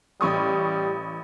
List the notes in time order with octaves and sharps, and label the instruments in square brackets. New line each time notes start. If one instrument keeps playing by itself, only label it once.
[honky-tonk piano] A1 C#6 D#6 [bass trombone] G3